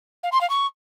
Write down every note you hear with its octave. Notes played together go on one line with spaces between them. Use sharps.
F5
C6
F5
C#6